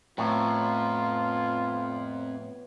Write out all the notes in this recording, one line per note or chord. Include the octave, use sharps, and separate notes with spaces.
F2 A2 B3 F4 C#5 A#5